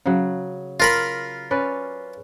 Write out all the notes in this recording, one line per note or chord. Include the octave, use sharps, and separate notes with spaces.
C#3 F#3
F4 A#4 B5
C#4 B4 D5